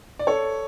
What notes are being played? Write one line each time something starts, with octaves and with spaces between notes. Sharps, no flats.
D5
A4 C#5